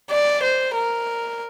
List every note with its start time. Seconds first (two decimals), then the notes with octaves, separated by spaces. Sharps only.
0.11 D5
0.43 C5
0.75 A#4